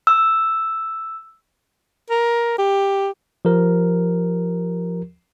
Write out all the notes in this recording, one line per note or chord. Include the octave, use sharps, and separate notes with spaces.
E6
A#4
G4
F3 G4 A#4